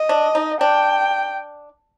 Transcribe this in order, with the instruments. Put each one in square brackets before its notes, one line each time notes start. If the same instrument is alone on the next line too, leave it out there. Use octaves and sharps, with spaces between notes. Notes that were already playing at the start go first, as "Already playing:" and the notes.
Already playing: [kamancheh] D#5
[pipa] D4
D#4
[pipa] D4 [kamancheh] G5